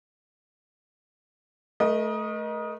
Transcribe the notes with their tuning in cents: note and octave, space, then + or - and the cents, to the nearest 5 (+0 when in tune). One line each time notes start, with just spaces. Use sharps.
A3 -15 A#4 +40 D#5 +0